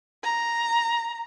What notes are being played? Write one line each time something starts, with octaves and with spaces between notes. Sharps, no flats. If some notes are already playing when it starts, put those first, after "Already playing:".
A#5